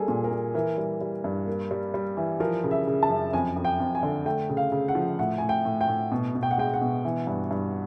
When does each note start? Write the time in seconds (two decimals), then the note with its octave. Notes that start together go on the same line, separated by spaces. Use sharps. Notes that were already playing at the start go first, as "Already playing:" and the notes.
Already playing: G3 A#3 G#4 A4
0.08 A#2
0.24 A#4
0.31 A#3
0.54 E3 A#4
0.78 G3
1.01 G3
1.24 G2
1.47 A#3
1.71 G3
1.94 G3
2.17 E3
2.40 F3 A#4
2.63 C#3
2.71 E5
2.87 C#3
3.03 A5
3.10 F#2
3.33 F2 G#5
3.56 F2
3.65 G5
3.80 F2
3.95 G#5
4.03 D3
4.26 A3 G5
4.49 C#3
4.57 F5
4.72 C#3
4.88 F#5
4.95 F3
5.19 A2 F#5
5.38 A2 G#5
5.49 G5
5.65 A2
5.81 G5
5.88 A2
6.12 B2
6.35 B2
6.43 G5
6.51 F#5
6.58 G#3 G5
6.74 F#5
6.81 B2
7.04 E3
7.27 G2
7.51 G2